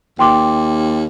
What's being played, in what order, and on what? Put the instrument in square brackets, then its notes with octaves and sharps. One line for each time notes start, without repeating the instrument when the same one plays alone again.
[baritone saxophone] D#2 [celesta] G5 C6 D6